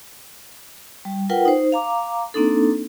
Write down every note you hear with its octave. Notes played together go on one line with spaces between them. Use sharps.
G3
F4 A#4 B4 F#5 G5
D#4 C5
F5 A#5 D6
A#3 C4 D4 D#4 A4